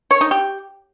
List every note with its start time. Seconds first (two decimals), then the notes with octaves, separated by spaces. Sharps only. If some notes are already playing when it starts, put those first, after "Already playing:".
0.11 C#5
0.21 D#4
0.31 G4